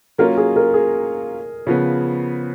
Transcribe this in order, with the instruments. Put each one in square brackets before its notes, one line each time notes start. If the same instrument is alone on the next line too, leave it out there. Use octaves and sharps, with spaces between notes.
[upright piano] F#3 A#3 C#4 F4 [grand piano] A#4
[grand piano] G#4
A#4
G#4
[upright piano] C#3 F3 B3